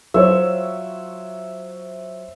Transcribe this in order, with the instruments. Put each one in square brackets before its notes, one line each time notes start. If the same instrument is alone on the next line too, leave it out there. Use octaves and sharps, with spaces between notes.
[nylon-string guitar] F#3 F4 [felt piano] C5 C#5 [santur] E5